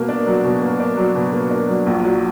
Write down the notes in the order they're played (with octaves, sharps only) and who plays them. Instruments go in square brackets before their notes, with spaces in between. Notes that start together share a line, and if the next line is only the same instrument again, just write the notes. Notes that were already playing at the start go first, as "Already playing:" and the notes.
Already playing: [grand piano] B2 A#3
D4
F#3
B2
A#3
D4
F#3
B2
A#3
D4
F#3
A#1
F#3